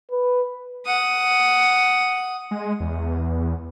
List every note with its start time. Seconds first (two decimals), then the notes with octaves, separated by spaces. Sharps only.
0.11 B4
0.86 F#5 D#6
2.51 G#3
2.80 E2